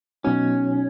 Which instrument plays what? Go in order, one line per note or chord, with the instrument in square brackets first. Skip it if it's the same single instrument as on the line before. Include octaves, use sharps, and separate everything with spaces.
[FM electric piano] B2 F#3 B3 D#4 F#4 [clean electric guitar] C#4